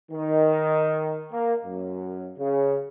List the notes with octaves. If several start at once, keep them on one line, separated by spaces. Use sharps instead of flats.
D#3
A#3
F#2
C#3